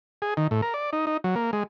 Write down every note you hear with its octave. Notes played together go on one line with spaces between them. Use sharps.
G#4
D#3
A2
A#4
D5
D#4
D#4
F#3
A#3
G#3